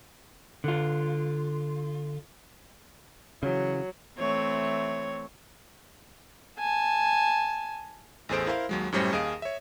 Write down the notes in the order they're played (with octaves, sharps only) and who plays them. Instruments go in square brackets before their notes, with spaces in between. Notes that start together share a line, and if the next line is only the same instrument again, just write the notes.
[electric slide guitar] D3 F4
[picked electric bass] C#3 E3 [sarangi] F#3
[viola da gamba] E3 A3 C4 [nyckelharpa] C#5
[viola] G#5 A5
[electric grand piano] A1 E2 G#4 A4 C5 D7
E4 A#4 C5 F5 C6
D#2 F#3 G#3
F#2 A2 G3 C#4 C5 A#6
D#2 G#4 D#5 F5 D#6 D7
C#5 E5